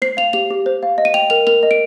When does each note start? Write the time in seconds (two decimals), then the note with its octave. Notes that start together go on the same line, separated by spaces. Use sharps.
0.02 C5 C7
0.17 F5 F7
0.33 G4 F7
0.50 G4
0.66 C5
0.83 F5
0.98 D#5
1.05 D#7
1.14 G5 F7
1.30 A#4 F7
1.47 A#4 F7
1.63 D#5
1.71 D7